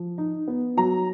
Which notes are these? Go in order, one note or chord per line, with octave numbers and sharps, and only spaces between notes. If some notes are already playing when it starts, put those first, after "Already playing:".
Already playing: F3
D#4
B3
F#3 A#5